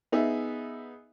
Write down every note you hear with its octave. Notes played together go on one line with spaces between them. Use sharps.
B3 D#4 G#4 E5